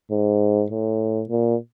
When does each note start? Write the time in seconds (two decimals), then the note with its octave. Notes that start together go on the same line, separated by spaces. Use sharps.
0.11 G#2
0.71 A2
1.29 A#2